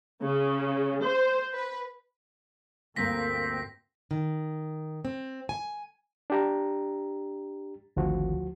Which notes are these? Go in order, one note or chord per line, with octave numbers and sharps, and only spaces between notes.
C#3
C5
B4
D2 G2 A#3 C4 A#4 A#6 B6
D#3
C4
G#5
D4 G4 A#5
G#1 D2 F3 F#4